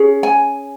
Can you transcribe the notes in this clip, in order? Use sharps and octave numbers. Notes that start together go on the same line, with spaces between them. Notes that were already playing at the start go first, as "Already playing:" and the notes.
Already playing: C#4 G#4
G#5